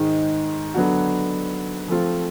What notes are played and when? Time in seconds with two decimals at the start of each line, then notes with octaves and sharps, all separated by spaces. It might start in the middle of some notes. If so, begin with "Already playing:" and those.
Already playing: G#2 D#3 G#3
0.74 D3 F#3 B3 D4 F#4
1.88 F3 A3 C4 F4